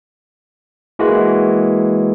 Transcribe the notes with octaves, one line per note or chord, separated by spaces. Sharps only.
E3 G#3 A#3 F#4